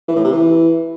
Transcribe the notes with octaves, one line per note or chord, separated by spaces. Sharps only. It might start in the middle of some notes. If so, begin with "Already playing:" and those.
E3
A2
C3
E3